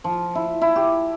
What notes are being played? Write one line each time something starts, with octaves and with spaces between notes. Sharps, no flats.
F3
E4
E4
G4